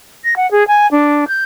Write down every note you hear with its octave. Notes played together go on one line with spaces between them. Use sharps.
A#6
F#5
G#4
G#5
D4
G6